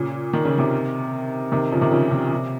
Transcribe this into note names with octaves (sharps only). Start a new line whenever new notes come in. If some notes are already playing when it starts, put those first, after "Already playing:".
Already playing: A#2 C#3
D#3
C#3
C3 D#3
C3 D#3
C#3 F3
C3 D#3
A#2 C#3
C3
C3